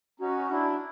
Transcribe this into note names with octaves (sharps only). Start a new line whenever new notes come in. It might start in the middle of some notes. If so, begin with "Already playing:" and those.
C#4 D#4 F#4
D4 E4